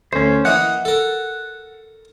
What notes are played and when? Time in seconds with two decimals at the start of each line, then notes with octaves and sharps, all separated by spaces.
0.13 D2 C#4 C5
0.45 E3 A#3 D#5 F#5
0.85 A4 A#4